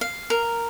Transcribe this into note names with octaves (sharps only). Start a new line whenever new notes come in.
F5
A#4